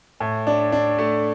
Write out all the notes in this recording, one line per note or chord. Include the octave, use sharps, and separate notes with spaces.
A2
D4
D4
A3